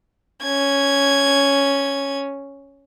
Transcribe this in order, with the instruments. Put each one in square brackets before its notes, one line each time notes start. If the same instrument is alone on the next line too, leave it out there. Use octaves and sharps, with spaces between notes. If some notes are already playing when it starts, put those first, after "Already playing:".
[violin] C#4 G#6